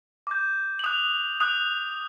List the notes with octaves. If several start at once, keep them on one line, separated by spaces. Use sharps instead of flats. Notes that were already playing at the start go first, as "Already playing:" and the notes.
D6 G6
F#7
D#6 F#6 F7
D#6 F#6 F7